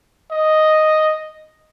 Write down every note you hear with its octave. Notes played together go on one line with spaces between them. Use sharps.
D#5